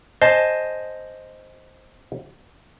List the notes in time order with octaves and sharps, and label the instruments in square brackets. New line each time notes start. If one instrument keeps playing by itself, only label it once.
[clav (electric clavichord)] C5 D#5 G#5 A5